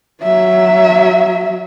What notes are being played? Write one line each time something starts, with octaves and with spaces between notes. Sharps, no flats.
F#3 E5